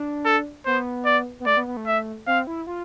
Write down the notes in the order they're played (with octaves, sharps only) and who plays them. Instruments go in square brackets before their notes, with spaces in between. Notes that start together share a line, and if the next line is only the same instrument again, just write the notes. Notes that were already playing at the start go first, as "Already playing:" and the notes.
Already playing: [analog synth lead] D4
[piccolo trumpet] A4
[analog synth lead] B3 [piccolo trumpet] C5
[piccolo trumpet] D5
[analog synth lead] B3
[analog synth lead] A3 [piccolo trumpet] D5
[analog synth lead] B3
B3
A3
[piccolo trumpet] E5
[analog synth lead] C4 [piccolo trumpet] F5
[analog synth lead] E4
F4